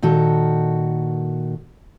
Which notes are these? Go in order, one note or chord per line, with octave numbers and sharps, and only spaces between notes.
A#2 D#3 F#4 A4